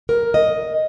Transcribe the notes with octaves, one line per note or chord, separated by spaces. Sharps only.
A#4
D#5